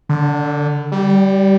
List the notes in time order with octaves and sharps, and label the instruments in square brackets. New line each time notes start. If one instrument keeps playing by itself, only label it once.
[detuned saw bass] D3
G3